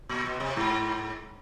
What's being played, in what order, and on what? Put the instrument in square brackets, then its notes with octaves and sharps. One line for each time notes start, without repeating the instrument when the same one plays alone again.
[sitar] A#2
B2
C3
G#2